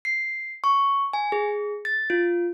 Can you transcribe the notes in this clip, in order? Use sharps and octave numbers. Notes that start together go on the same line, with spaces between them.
C7
C#6
G#5
G#4
A6
F4